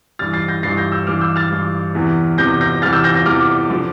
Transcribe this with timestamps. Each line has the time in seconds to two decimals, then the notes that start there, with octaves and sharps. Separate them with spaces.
0.19 G2 E3 F6 A6
0.33 A6 C7
0.48 G6 A#6
0.63 G2 E3 A6 C7
0.77 G6 A#6
0.92 E6 G6
1.07 G2 E3 D6 F6
1.21 E6 G6
1.36 F6 A6
1.51 G2 E3
1.95 E2 C3 E3
2.38 E2 C3 E3 G6 A#6
2.61 G6 A#6
2.82 E2 C3 E3 F6 A6
2.93 E6 G6
3.04 G6 A#6
3.15 G6 A#6
3.25 E2 C3 E3 D6 F6
3.70 D3 F3